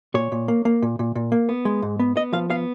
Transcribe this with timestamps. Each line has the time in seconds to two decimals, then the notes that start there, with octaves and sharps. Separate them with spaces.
0.14 A#2 C#5
0.32 A#2
0.48 A#3
0.65 A#3
0.82 A#2
0.99 A#2
1.15 A#2
1.32 A#3
1.49 B3
1.65 G#3
1.82 G#2
1.99 B3
2.16 B3 D#5
2.33 F3 F5
2.50 B3 F5